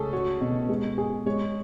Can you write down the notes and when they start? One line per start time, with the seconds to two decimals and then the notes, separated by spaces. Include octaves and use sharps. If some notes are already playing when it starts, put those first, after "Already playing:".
Already playing: C#2 A3 C#4 G#4 A4
0.13 F#4 C#5
0.41 B2
0.69 G#3
0.98 G#4
1.26 G#3 C#5